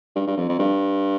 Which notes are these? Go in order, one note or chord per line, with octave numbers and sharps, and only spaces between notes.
G2
G2
F2
F2
G2